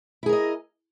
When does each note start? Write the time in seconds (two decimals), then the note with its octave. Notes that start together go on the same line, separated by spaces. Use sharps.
0.23 E4
0.26 G#4
0.29 A#4
0.33 D#5